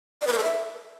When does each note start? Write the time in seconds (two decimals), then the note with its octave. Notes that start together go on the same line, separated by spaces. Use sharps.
0.22 D5
0.27 B4
0.32 A#4
0.38 A4
0.43 E5